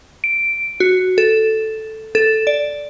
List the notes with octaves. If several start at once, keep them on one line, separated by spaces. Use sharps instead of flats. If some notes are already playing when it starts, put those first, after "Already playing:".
D7
F#4
A4
A4
D5